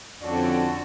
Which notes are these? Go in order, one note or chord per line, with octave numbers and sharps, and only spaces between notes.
F2 G#2 D3 C#4 F#4 A4 D5